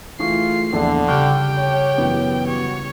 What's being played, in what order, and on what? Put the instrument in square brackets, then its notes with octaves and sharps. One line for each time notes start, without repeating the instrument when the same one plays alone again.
[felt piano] E3 A3 C#6 [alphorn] F4 [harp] G#4 [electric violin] C7
[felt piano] A#1 E2 [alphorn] D3 [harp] A4
[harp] C#3 G3 [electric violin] G4 G5 [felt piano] C#6 F6 F#6
[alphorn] C#5
[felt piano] F#2 E3 B3
[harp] G3 [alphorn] F#4 [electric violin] C#5